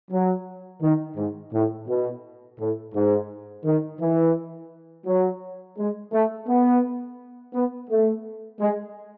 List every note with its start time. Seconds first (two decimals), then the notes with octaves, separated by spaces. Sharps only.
0.11 F#3
0.82 D#3
1.17 G#2
1.53 A2
1.88 B2
2.60 A2
2.95 G#2
3.65 D#3
4.00 E3
5.06 F#3
5.78 G#3
6.13 A3
6.48 B3
7.54 B3
7.90 A3
8.60 G#3